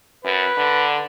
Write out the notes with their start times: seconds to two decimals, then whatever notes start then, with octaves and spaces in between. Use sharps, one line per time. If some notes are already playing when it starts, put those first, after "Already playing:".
0.25 F#2 B4
0.57 D3